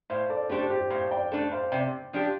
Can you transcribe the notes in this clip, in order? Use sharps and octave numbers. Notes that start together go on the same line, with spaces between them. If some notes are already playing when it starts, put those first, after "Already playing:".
A2 C5 F5
A4 D5
A3 D4 G4 A4 C5
G4 C5
A2 C5 F5
D5 G5
A3 D4 A4
C5 F5
C3 D5 G5
F3 D4 G4